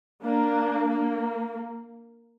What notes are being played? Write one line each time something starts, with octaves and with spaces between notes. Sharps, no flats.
A#3 D4
A#3